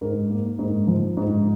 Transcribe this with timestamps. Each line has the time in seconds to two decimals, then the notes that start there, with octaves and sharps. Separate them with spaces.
0.01 G#2 A#4
0.30 A#3
0.59 G#2
0.87 F3
1.17 G#2